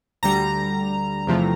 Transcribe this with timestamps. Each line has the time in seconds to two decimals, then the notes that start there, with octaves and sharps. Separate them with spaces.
0.23 D2 D3 G3 A#5
1.27 E2 C3 F3 A3